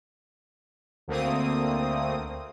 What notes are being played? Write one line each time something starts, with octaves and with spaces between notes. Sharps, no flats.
D2 A3 A#3 C4 D#6